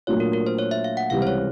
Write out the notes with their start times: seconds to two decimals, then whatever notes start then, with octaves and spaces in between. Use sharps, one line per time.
0.07 A#2 F#3 A3 D4 F4 C#5
0.20 A#4
0.33 A#4
0.47 C5
0.58 C#5
0.71 E5
0.84 F5
0.97 F#5
1.10 C#2 C3 E3 G3 F5
1.22 C5
1.27 C#5